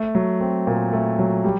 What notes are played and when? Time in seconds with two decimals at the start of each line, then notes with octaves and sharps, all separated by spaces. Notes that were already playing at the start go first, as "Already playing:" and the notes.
Already playing: A3
0.15 F#3
0.40 C4
0.67 A#2
0.92 A3
1.19 F#3
1.44 G3